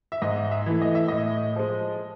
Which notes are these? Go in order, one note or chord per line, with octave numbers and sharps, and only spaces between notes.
E5
G#2 D#5
E5
E3 A3
D#5
E5
A2 D#5
F3 G#3